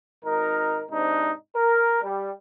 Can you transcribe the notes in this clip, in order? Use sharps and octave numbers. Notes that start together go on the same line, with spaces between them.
G#1 D#4 A#4
G#2 C3 D4 D#4
A#4
G3